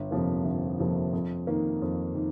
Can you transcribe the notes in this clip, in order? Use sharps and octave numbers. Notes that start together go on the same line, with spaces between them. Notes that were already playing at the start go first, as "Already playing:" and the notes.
Already playing: G1
F2 C3 F3 A#3
G1
F2 C3 F3 A#3
F2
D#3 A#3
F2
D#3